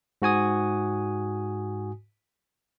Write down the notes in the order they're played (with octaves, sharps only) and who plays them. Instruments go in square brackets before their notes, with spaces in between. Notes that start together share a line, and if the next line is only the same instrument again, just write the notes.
[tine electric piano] G#2 F#4 G#5 D#6